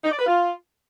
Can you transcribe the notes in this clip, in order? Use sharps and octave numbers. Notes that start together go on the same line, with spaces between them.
D#4
D5
B4
F4